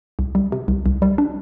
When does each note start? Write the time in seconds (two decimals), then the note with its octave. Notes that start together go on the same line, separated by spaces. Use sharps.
0.19 C2
0.35 G3
0.52 C3
0.68 C2
0.86 C2
1.02 G3
1.18 D4